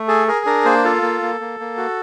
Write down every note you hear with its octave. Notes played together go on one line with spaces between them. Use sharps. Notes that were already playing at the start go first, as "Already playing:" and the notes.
Already playing: A3
G#4 A4
G#4 A#4
D4 A#4
A#3 C5
F4 A4
A#3
A#3
A#3
A#3
F#4